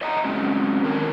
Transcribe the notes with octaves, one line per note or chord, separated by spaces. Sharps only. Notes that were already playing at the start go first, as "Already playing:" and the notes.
C#5 D#5 E5 F#5 G5 A#5
F#3 G#3 C4 C#4
D3 D#3 A#4 C#5